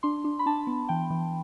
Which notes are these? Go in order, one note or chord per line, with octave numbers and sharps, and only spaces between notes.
D4 C6
D4
B5
D4 A5
B3
E3 G5
E3